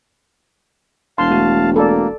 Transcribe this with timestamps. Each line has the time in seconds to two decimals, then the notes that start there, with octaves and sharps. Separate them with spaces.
1.18 E1 F5 A5 C6
1.31 A3 F#4
1.76 A#3 A4 D5